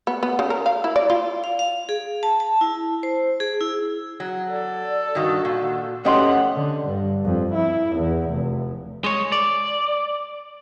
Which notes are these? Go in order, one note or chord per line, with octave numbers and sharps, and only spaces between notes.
B3
B3
C#3
A#4
F5
E4
D5
F4
F5
F5
G#4
A5
A5
E4
C5
G#4
E4
F#3
A4 D5
G2 D#3 F#4
A#2
F2 A3 B3 C#4 G4 D#5 F#5 C6
D3
G2
F2
E4
E2
F1
G#3 C#5
D5